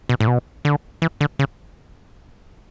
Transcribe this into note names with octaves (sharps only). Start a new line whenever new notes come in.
B2
A2
B2
D3
E3
D3
C#3